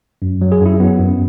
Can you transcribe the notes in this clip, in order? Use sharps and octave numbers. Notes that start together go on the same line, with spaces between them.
F#2
F#3
G#4
F#2
E4
F#3 B3
F#2